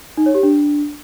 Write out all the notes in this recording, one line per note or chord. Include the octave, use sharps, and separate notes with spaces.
D#4
C#5
G4
D4